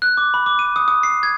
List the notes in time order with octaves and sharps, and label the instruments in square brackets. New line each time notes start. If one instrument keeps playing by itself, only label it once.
[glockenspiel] F#6
D6
B5
D6
D#7
D#6
D#6
C7
G#6